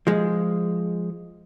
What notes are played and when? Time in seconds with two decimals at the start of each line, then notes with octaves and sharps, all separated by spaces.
0.07 F3 G#3